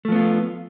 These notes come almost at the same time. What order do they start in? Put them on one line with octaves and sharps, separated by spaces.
A3 F3 B3 F4